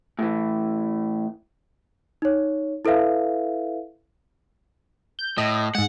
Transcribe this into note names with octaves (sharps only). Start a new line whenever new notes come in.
A2 E3
D#4 C#5
E4 A4 B4 E5 F5
G6
A2 D#5
G#2 G#3 F#5